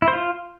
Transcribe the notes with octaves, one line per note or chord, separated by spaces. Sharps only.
E4
C5
F4